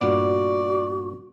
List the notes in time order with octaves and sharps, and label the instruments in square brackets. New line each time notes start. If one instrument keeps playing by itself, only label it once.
[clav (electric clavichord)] G2 A#2 B3 [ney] F#4 [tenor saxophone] D5